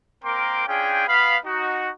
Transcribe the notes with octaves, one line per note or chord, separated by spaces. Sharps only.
A#3 C4 A#4 G5 C6 D6
C#4 D4 F4 G#4 G5
B3 F5 B5
D#4 F#4